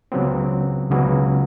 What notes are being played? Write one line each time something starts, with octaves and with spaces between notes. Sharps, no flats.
C#2 C#3 F#3 B3 C4
C#2 C#3 F#3 B3